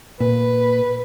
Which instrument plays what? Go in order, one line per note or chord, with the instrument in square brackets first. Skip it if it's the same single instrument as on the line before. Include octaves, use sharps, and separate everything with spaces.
[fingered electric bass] A#2 [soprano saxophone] B4